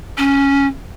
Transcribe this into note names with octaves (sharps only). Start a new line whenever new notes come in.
C#4